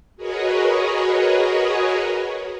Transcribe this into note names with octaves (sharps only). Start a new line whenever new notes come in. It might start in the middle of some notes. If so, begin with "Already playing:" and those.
F#4 G#4 A#4 B4 C#5 D#5